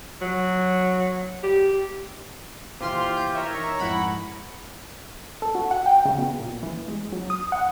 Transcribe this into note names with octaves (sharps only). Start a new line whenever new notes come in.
F#3
G4
A#2 E3 E4 F4 G4 C5 C6 F6
G6
A#4 C#5 E5
D#4 A#5 C#6
F2 G#2 E4 F#5 B5
A4
F#4
F#5
G5
C#3
B2
A#2
E3
G#3
F#3
D#6
F#5